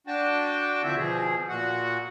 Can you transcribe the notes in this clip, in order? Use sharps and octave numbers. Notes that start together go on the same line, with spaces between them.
D4 F#4 G5 A5
D2 D3 F3 C4 E4 E5
B2 F3 G#4
A#2 F#4 F#5